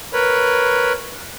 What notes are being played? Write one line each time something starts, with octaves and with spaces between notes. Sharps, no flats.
A#4 B4 C#5 B5